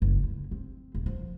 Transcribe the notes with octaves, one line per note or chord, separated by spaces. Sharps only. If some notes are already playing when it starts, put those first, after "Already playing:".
F#1
D3
C4
D#1
F3